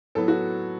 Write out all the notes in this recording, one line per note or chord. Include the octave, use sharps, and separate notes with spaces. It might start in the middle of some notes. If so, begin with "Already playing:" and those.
A2 F#3 B3 A4
F#4